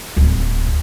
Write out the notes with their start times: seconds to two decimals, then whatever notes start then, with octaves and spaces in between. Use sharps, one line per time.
0.16 D1 D#2